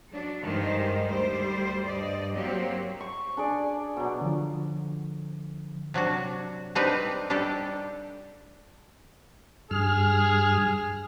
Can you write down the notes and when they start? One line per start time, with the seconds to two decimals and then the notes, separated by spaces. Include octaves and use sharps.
0.10 F#3 D4
0.43 G2 D#3 G#3 G4 C5
1.07 D2 G3 C5
1.83 G2 D5 D#5
2.33 F#3 A#3 C4 G4
3.01 C#6
3.37 D4 G#4 D5
3.97 B2 F#3
4.21 D3 F3
5.94 C3 F#3 D4 F#4
6.75 G3 C4 D4 D#4 G4 B4
7.30 G3 D4 D#4 G4 A4
9.71 G2 G#4 F6